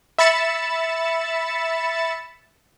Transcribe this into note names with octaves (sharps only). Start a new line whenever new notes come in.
E5 B5 A6 C#7 E7